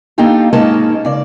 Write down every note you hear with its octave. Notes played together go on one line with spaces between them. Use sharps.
A#3 D4 D#4 F4 G4 A4
G#2 G#3 A#3 C#4 D#4 A5
C#3 D5